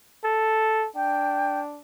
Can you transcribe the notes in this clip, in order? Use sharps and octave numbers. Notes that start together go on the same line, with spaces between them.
A4
D4 G5